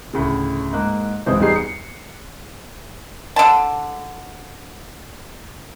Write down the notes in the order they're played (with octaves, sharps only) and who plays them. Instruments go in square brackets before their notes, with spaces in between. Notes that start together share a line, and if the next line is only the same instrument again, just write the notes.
[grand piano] D2 A2 C#3
G#2 A#3 F#6
B1 G#2 C3 E3 C5 D#6
E2 G3 D#4 G#4 C7
C#7
[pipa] D3 A5